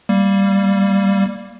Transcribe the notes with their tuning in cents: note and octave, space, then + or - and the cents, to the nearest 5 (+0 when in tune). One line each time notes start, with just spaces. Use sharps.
G3 +0 A#3 +0